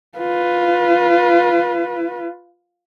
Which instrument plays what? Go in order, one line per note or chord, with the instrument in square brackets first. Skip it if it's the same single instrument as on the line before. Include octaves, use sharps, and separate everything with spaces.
[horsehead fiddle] F4 B4